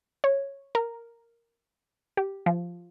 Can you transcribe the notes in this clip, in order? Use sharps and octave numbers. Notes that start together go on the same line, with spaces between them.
C#5
A#4
G4
F3